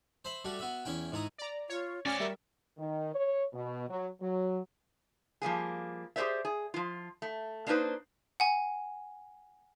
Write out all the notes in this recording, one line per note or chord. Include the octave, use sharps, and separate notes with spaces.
C5 E5 B5
G3 A3 F#4 G4
B3 F#4 E5
E2 C#4 E4 G5
G#2 E4 A#5 D#6
D5 A#5
F4 C#5
C#4 F#4 D5 G#5 F6
G3 A#4 E5
D#3
C#5
B2
F#3
F#3
F3 G3 A#3 G#4
G4 G#4 A#4 C5 D5 E5
G#4
F3 F4
A3
A#3 D4 D#4 G#4 B4 C5
F#5 G#5